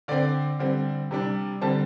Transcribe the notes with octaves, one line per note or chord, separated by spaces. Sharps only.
D3 C4 D5
D3 G3 C4
C3 G3 D4
D3 G3 C4 A5